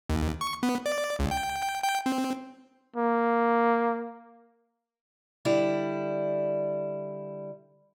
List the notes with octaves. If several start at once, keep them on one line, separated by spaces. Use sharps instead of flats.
D#2
C#6
B3
D5
C#2
G5
G5
G5
C4
A#3
D3 G3 E4